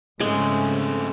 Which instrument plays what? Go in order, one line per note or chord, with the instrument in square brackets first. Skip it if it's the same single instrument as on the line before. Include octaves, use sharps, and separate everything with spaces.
[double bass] G#2 C#3 [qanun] G#3 [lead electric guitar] A3 C4